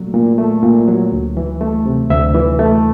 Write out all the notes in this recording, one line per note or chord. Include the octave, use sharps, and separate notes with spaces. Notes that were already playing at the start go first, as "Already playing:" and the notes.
Already playing: A#2 F#3 A3
A#2
A3
A#2
F#3
D2
E3
A3
C3
D2 E5
E3
A3